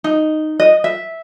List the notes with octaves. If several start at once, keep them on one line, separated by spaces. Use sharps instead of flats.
D#4
D#5
E5